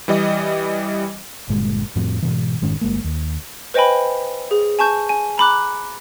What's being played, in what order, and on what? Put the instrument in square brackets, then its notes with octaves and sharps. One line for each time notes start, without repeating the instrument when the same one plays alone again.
[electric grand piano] E3 G3 D#5
[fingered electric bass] G1 G2 A#2 G#3
F2 A2 F3 C4
G#2 B2 E3
F1 G#2 D#3 C#4
G1 G#3 A#3
D#2
[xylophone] B4 C5 D#5 G5 G#5 B5
G#4
G#5 A5 C#6 G6
G#5
A#5 B5 D6 F#6